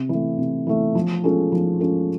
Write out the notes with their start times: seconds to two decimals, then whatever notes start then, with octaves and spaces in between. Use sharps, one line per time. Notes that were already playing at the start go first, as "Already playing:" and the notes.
Already playing: C3
0.09 E3 A3
0.38 C3
0.67 E3 A3
0.95 F3
1.24 G#3 C#4 F4 A4
1.52 F3
1.80 G#3 C#4 F4 A4